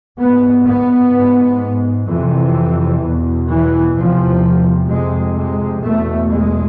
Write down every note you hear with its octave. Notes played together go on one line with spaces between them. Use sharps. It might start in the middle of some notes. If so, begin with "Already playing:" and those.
G#2 B3
B3
G#2
F2 C3 E3
E2 B2
E3
E2 C3 F3
F2 C3 G#3
G#3
E2 B2 A3
G#3